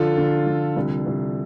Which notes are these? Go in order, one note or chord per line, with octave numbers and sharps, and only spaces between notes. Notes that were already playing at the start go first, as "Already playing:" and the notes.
Already playing: D3 F3 F4 A4
D3
F3
C2
C2